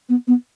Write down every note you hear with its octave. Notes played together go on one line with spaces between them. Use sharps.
B3
B3